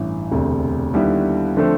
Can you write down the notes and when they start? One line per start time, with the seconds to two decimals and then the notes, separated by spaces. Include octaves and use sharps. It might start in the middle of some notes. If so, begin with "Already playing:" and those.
Already playing: A1 G2 E3
0.31 E1 D2 C3
0.94 D#2 D3 G3 B3 E4
1.57 D3 F3 A3 C4